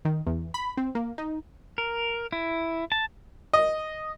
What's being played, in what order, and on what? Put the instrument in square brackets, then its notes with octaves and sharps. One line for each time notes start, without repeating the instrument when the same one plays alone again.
[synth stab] D#3
E2
B5
C4
A#3
D#4
[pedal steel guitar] A#4
E4
A5
[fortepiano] D#5